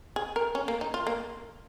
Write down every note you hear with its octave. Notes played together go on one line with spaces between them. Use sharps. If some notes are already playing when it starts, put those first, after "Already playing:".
G#4
A#4
C#4
A#3
D#4
F4
A#3